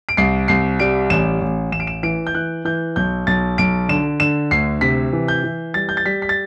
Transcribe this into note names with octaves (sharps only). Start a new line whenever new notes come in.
D7
C2 C7
C2 C7
G3 D7
A1 E7
A1
A1 E7
D7
E7
E3 D7
G6
E3 F#6
E3 G6
B1 G6
B1 A6
B1 D7
D3 E7
D3 E7
D2 C7
C3 B6
E3
G6
E3
G3 A6
G6
A6
G3 B6
B6
A6